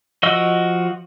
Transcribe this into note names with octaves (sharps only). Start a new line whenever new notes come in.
F3 F#4 D#5 E6